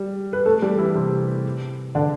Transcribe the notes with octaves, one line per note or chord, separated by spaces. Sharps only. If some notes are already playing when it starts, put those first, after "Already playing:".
Already playing: G3
B4
A3 A4
G3 G4
E3 E4
C3 C4
D3 D4